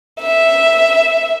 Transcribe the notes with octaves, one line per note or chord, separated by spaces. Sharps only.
E5